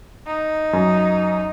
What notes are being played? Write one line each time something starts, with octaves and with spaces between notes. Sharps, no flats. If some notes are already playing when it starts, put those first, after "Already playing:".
D#4
F#2